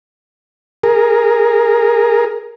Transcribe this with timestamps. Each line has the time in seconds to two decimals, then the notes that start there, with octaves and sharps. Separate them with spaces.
0.83 G#4 A#4